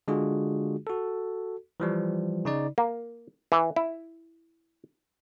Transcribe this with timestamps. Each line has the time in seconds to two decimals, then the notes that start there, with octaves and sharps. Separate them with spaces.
0.08 D3 G#3 D4 F4 F#4 G#4
0.87 F#4 A4
1.80 E3 F3 G3
2.45 C#3 D#4 D5
2.78 A#3
3.52 E3
3.76 E4